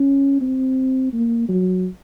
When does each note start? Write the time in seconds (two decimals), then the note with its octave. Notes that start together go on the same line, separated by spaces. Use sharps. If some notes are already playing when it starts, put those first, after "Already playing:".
Already playing: C#4
0.41 C4
1.13 A#3
1.49 F#3